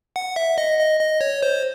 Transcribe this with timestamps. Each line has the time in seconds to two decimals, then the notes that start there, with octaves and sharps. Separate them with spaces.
0.16 F#5
0.36 E5
0.58 D#5
0.79 D#5
1.00 D#5
1.21 C#5
1.43 C5